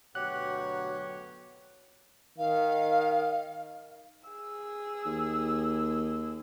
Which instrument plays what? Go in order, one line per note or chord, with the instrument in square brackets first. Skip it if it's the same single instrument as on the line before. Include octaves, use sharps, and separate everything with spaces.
[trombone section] D2 B2 F#3 [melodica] G4 F#5 [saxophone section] C#5 [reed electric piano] F#6
[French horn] D#3 [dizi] F5
[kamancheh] G#4 E6
[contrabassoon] D#2